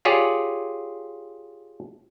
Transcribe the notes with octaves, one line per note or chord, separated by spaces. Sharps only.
F4 G4 G#4 C#5 D5